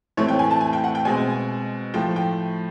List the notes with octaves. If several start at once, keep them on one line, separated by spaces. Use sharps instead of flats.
A2 E3 A3 C4 C#5
G5
G#5
A5
G#5
G5
F#5
G5
B2 G#3 C4 G#5
A2 F3 A3 G5
G5